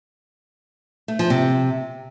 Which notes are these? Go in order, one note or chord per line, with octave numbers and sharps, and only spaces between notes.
A3
F3
C3